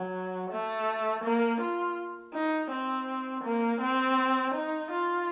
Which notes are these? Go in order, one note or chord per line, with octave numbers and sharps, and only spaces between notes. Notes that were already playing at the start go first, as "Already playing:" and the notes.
Already playing: F#3
A3
A#3
F4
D#4
C4
A#3
C4
D#4
F4